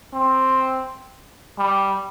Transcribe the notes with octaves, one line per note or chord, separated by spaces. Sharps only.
C4
G3